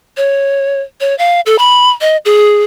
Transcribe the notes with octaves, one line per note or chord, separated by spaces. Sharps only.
C#5
C#5
F5
A4
B5
D#5
G#4